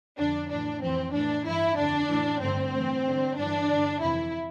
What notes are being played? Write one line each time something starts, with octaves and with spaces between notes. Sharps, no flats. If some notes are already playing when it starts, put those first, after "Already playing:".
F2 D3 D4
A2 E3 D4
F2 E3 C4
A2 E3 D4
G2 E3 E4
F2 D3 D4
A2 E3
G2 D3 C4
A2 E3
G2 D3
G2 E3 D4
G2 D3
F2 C3 E3 E4